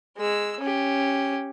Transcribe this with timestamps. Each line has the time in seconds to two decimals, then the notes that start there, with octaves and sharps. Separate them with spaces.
0.17 G#3 E6
0.60 C#4 G4